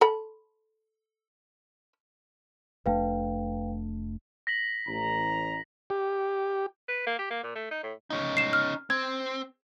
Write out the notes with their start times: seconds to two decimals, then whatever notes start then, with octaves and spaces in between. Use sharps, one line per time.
0.01 A4 B5
2.86 F1 A3 D4 B4 F5 G5
4.47 A#6 B6 F#7
4.88 A1 A#5
5.90 G4
6.89 B4
7.07 A#3
7.19 G4
7.31 A#3
7.43 A#2
7.56 A3
7.71 D#4
7.84 A2
8.10 C#4 D#4
8.37 C7 E7
8.53 F6
8.90 C4 G#6